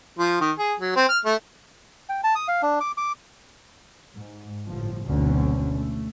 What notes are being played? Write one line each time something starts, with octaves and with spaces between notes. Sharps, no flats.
F3
D#3
G#4
F#3
C4
F6
A3
G5
A5
D#6
F5
D4
D6
D6
G#2
G1 A2 F3
F#1 D2 B2 D3 C4 C#4
A3